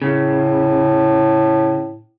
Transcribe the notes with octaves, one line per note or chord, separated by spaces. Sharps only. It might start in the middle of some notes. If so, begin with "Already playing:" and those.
A2 C#3